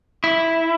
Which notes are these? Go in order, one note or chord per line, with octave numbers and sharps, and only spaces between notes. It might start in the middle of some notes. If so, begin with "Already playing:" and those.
E4